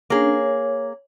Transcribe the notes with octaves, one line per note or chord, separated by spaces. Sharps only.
A#3 C#4 D4 G#4 C#5
C#5